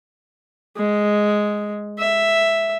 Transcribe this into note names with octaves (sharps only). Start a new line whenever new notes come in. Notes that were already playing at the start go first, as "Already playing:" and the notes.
G#3
E5